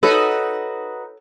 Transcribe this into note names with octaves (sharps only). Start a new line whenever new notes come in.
D#4 F#4 A4 B4 C#5